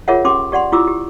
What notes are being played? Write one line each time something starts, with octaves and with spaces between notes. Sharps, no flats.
F4 G#4 A#4 C#5 E5 F#5
C#4 G4 C6 D6
G4 D5 F#5 C6
E4 F4 G4 D6 E6
G4